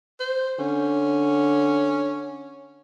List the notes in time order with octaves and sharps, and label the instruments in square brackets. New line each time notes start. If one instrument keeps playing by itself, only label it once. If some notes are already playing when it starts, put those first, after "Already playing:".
[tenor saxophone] C5
[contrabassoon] D3 [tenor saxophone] C#4